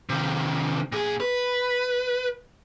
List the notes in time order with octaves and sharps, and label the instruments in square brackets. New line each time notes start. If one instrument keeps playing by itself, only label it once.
[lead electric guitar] C3 D#3
A#2 G#4
B4